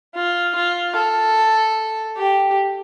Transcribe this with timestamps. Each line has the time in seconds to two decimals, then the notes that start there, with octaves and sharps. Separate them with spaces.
0.14 F4
0.55 F4
0.96 A4
2.17 G4